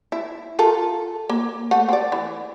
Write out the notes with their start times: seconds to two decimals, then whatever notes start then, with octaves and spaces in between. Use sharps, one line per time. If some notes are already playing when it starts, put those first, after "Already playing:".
0.12 E4
0.59 F4 A4 A#4
1.29 A#3
1.71 A3 F#5
1.89 C4 D5
2.12 E3